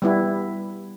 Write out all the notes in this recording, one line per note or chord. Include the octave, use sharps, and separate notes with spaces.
G3 B3 E4